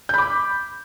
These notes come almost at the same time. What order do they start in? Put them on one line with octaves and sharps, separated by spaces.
G6 B5 D6